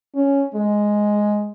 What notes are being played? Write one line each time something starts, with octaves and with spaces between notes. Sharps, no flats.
C#4
G#3